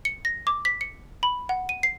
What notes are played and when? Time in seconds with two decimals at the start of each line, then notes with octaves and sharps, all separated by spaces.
0.05 C#7
0.25 A#6
0.47 D6
0.65 B6
0.81 C#7
1.23 B5
1.49 F#5
1.69 D#7
1.83 C7